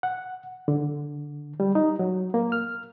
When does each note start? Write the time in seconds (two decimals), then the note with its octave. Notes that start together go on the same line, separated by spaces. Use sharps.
0.03 F#5
0.68 D3
1.60 G3
1.75 D#4
1.99 F#3
2.34 A#3
2.52 F6